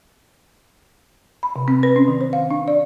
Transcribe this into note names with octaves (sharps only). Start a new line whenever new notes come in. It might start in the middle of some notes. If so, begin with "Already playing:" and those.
B5
C3
C4
B4
C#4
D#3
C5
F5
D4
D5